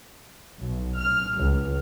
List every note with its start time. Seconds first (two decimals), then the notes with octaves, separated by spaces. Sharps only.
0.61 B1
0.98 F6
1.34 C#2